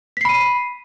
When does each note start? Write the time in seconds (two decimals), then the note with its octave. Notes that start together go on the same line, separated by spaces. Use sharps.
0.17 B6
0.21 C7
0.25 B5
0.29 D#7